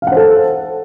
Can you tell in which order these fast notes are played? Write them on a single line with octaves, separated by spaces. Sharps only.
F5 F#5 C5 A4